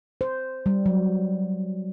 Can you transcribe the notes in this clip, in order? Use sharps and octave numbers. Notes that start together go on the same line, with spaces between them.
C5
G3
F#3